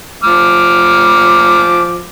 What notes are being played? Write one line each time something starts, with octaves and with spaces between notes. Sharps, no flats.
F3 D6 F6